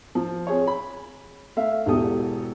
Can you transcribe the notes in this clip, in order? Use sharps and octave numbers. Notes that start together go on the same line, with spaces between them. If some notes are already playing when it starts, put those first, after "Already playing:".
F3
C4 G#4 C#5
B5
A3 E5 F5
E1 E2 B2 G4 A4 D#6